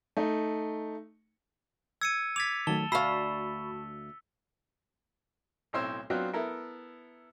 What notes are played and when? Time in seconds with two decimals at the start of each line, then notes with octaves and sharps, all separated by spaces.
0.17 A3 D#4
2.01 E6 G#6 C#7 D#7
2.36 D6 G#6 A6 B6 F7
2.67 D#3 F#3 A3 A5 G7
2.92 D2 F#4 F5 A5 B5 C#6 E6 B6
5.73 B1 A2 C4 C5 C#5 E6
6.10 F#3 B3 C4 D4 F4 F#4
6.33 B3 E4 A4 A#4